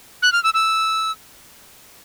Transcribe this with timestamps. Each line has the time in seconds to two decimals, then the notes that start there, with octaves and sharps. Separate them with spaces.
0.22 F#6
0.32 F6
0.44 E6
0.54 E6